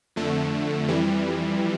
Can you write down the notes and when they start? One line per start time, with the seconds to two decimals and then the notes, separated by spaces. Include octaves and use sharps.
0.16 F2 D3 A3
0.88 F2 E3 G3